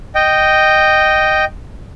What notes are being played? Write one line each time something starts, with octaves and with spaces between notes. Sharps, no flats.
D#5 G5